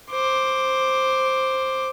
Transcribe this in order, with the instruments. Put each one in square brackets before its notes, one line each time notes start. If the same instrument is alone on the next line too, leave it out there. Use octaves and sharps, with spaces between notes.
[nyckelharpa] C5 D6